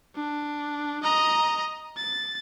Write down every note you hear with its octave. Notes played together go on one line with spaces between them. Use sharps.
D4
D#5 A#5
A6